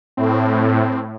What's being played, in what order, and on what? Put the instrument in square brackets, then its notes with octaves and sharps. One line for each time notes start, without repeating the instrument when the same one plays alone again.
[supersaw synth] A2 [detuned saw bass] C4